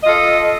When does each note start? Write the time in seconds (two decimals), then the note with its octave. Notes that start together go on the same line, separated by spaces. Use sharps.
0.03 D#5
0.06 F4
0.09 A4